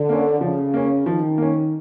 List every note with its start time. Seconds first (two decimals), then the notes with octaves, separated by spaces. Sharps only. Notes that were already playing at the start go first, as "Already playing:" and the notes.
Already playing: D3
0.09 A#3 C#4
0.41 C#3 F3
0.74 A#3 C#4
1.06 D#3 F3
1.38 A#3 C#4